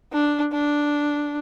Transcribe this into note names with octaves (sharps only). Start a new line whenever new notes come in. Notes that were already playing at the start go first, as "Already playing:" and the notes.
D4
D4